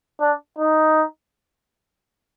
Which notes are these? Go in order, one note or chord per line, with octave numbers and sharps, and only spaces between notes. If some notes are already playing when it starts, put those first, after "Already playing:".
D4
D#4